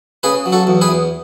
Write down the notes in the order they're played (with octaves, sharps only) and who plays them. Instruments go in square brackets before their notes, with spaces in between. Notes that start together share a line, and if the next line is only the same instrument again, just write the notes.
[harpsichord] C#3 G#4 B4
F#3
F#4 A4
E2
G#4 B4
E2